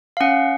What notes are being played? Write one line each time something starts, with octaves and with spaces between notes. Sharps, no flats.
F5
C#4 F#5